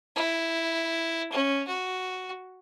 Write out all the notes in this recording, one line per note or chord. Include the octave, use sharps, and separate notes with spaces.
E4
C#4
F#4